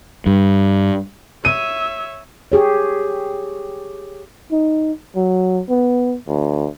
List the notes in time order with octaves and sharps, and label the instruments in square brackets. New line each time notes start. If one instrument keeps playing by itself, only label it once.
[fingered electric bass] G2
[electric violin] C#5 E5 [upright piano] D#7
[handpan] G4 G#4 C#5
[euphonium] D#4
F#3
B3
D2